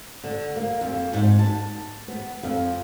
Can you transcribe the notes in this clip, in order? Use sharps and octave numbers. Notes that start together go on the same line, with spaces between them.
D3
A#3
F2
G#2
A5
B3
F2